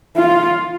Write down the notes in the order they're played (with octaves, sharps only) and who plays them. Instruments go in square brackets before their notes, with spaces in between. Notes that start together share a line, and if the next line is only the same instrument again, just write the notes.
[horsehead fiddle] F4